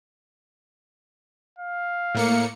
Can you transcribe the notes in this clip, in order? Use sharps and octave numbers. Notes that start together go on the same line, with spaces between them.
F5
A2 A#3 C#7